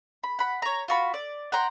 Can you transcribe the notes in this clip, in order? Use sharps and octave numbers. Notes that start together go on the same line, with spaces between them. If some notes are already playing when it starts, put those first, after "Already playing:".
B5
F#5 B5
C#5 A#5
F4 F#4 B5
D5
F#5 G5 A#5 C6